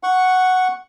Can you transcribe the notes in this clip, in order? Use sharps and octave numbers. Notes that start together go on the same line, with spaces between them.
F#5 C#6